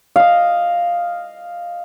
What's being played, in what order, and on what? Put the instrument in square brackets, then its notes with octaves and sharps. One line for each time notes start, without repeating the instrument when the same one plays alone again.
[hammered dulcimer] D#5 F5